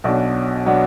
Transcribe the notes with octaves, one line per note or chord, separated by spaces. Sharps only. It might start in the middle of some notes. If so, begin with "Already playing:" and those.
B1 B2 F#3 B3 D4
B2 F#3 B3 D4